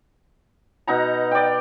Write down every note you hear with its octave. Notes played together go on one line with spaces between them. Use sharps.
B2 D#4 F#5 A#5
D5 G5